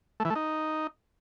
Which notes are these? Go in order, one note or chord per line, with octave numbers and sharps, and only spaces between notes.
A3
E3
A3
D#4